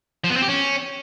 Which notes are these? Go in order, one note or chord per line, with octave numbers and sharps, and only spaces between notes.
F3
B3
C4
G4
C#4